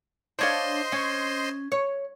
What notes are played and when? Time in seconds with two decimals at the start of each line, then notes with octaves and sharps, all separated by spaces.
0.39 D4 C5 C#5 D#5 F5 C6
0.92 C#4
1.72 C#5